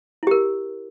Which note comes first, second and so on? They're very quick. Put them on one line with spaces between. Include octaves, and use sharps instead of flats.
E4 G4 A#4